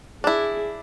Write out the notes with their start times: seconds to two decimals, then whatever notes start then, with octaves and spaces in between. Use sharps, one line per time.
0.24 D4 E4 G#4